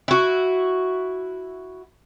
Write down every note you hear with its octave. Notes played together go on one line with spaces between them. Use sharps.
E4 F#4